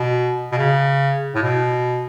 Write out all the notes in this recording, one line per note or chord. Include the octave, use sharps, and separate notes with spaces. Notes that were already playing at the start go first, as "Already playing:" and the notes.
Already playing: B2
B2
C#3
A2
B2